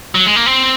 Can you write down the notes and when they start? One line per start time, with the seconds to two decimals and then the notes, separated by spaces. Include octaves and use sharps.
0.15 F#3
0.26 G#3
0.36 A#3
0.46 C4